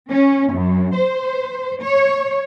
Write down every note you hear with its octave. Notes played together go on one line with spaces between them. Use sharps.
C#4
F#2
C5
C#5